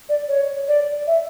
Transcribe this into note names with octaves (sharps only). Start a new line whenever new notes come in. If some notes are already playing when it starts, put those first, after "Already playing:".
D5
C#5
D5
E5